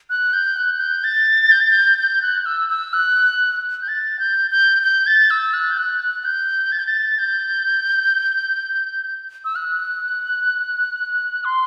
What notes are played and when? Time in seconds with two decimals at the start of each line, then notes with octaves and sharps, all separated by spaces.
0.10 F#6
0.33 G6
0.57 F#6
0.80 G6
1.04 A6
1.51 G6
1.61 A6
1.71 G6
1.99 G6
2.22 F#6
2.46 E6
2.70 E6
2.93 F#6
3.82 G6
3.88 A6
4.19 G6
4.51 G6
4.83 G6
5.07 A6
5.30 E6
5.53 F#6
5.71 G6
5.78 F#6
6.25 G6
6.72 A6
6.79 G6
6.87 A6
7.19 G6
9.45 E6
9.56 F#6
11.45 C6